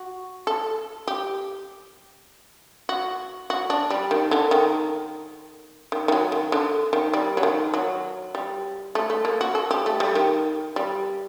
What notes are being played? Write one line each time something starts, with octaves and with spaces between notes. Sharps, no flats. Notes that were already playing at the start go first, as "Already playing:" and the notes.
Already playing: F#4
A4
G4
F#4
F#4
D4
G3
D#3
D3
D#3
D#3
D#3
F#3
D#3
D3
D#3
G3
F#3
D#3
F#3
G3
A3
A3
A#3
F#4
A4
G4
A3
G3
D#3
G3